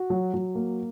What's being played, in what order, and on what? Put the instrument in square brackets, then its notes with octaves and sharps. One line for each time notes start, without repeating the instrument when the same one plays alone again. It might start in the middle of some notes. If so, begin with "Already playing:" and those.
Already playing: [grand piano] F#4
F#3
F#3
A#3